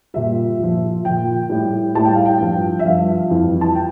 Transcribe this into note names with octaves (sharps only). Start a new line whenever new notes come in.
A#2 G3 E5
A#2 F3
A#2 F3 G5
A2 G3
A2 G3 A5
G5
F5
G5
G2 F3
E5
G2 F3 F5
F2 E3 G3
A5
G5